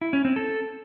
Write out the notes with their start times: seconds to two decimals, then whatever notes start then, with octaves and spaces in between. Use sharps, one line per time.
0.01 E4
0.13 C#4
0.25 C4
0.36 A4